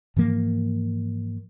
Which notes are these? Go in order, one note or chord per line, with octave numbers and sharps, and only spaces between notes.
G#2 E3 F3 A#3